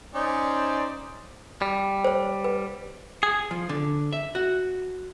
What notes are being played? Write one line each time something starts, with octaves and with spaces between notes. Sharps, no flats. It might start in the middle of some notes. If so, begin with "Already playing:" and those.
C#4 D#4 C5 D5
G3
C5 C#5
B4
G#4
F3
D3
E5
F#4